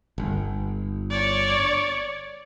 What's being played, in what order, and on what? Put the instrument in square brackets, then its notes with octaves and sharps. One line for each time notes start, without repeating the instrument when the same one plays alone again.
[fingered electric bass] G1
[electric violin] C#5 D5